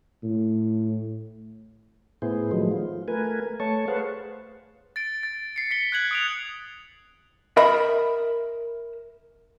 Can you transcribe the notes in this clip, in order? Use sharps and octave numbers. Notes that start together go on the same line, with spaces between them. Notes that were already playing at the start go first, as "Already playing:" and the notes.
A2
A2 B3 E4 G#4 C5
D#3 F3 F#3 G#3 A3
F4
A3 A#4 B4 G#5
A3 C#5 A5 C#6
G#4 B4 C5 F5 F#5 A5
A6 D7
A6
C7 C#7
B6 C#7 G7
F#6 G#6 F#7
D#6 D7 F7
A#4 D#5 E5 B5